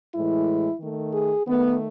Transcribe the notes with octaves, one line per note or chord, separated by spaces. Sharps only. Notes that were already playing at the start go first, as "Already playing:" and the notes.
A2 E3 G#3 E4
D#3 A3
G#4
D#3 A3 B3